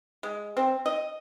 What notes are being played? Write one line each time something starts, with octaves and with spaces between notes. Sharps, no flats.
G#3
C4
D#5